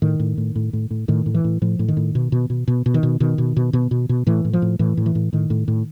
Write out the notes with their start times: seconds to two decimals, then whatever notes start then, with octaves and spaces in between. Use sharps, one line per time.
0.02 A2 D#3
0.20 A2
0.37 A2
0.56 A2
0.73 A2
0.90 A2
1.08 A2 D#3
1.26 A2
1.34 E3
1.44 A2
1.62 A2 F3
1.79 A2
1.88 D#3
1.97 A2
2.15 B2
2.32 B2
2.50 B2
2.68 B2
2.86 B2
2.94 D#3
3.03 B2
3.20 B2 D#3
3.38 B2
3.57 B2
3.73 B2
3.91 B2
4.09 B2
4.27 A2 E3
4.45 A2
4.53 F3
4.62 A2
4.79 A2 E3
4.97 A2
5.06 E3
5.15 A2
5.33 A2 D#3
5.50 A2
5.68 A2